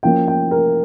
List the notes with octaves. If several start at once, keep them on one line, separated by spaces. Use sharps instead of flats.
F3 A#3 C#4 G5
G5
A#4